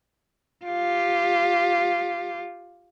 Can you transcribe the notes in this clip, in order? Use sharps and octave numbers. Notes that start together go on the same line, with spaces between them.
F4 G4